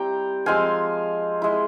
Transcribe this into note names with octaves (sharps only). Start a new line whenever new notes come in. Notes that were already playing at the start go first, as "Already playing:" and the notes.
Already playing: G3 C4 E4 G5 A#5
F3 G#3 C4 F4 F5 G#5
G#3 E4